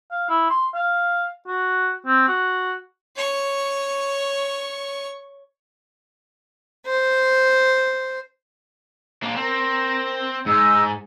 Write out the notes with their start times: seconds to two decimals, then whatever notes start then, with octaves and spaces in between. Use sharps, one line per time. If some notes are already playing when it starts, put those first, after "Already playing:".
0.11 F5
0.29 E4
0.50 C6
0.74 F5
1.47 F#4
2.06 C4
2.28 F#4
3.16 C#5 C#6
6.85 C5
9.24 A#3 D4
9.36 C4 A#4
10.46 G#2 D#4 D#5 E6